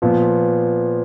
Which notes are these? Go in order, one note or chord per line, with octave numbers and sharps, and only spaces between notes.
A#2 F3 B3